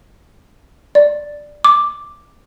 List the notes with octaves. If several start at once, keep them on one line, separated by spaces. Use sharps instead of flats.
D5
D6